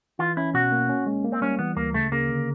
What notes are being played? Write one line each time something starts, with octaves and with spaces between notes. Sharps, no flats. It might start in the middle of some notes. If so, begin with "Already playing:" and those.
E3 F4
C#4 E4
B2 F#4
A#3
C#4
G#3
A#3
C4
G3 C#4
E3 B3
D2 A#3
C#3 A3
C#3 A#3
D3